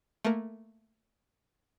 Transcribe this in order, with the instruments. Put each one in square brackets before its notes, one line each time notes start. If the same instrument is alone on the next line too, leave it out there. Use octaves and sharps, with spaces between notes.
[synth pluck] A3 A#3 A#4